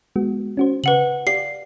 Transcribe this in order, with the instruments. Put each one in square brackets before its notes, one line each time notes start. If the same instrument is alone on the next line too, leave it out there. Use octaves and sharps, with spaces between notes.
[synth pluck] G#3 B3 F#4
C#4 F#4 C5
[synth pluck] C#3 [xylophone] B4 F#5 F#7
[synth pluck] G4 D5 F5 [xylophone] C7